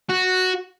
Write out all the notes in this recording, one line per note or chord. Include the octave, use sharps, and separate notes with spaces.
F#4